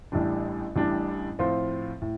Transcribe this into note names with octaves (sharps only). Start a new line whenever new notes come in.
A1 A2 G3 D4
A1 A2 G3 D4
A2 F3 C4 F4 C5
A2